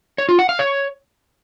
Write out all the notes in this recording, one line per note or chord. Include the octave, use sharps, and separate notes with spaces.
C#5
F4
F#5
F5
C#5